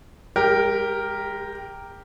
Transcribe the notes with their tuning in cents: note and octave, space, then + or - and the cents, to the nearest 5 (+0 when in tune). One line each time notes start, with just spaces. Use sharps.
G#3 -40 G4 +0 A#4 +0